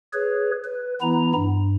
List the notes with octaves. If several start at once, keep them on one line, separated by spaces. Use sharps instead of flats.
G#4 B4 C#5
B4
E3 B3 E4 A#5
G2